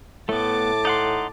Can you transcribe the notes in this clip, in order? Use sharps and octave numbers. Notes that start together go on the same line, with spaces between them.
A2 A3 B3 A5 D6
D#4 F#5 C6